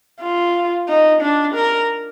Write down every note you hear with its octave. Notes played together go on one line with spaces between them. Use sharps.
F4
D#4
D4
A#4